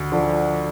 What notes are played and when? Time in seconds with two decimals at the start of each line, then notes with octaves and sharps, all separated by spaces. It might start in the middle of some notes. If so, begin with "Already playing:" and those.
Already playing: D2
0.12 D3 F3